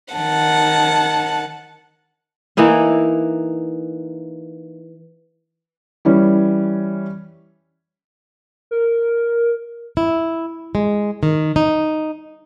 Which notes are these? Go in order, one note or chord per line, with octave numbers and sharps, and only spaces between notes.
D#3 F#5 A5
E3 A#3 D#4 E4
E3 G3 C#4
A#4
E4
G#3
D#3
D#4